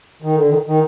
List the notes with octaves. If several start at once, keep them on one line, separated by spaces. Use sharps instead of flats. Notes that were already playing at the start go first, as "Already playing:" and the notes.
D#3
D3
D#3
D#3